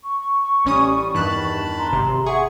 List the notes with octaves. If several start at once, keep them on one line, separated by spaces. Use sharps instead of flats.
C#6
A1 G3 C#4 D#6
E2 G2 D#3 A5 B5 F#6
A#5 C6
G#1 C3
G#4 E5 F#5 G#5 C#6